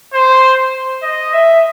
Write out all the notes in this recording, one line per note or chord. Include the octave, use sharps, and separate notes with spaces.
C5
D#5
E5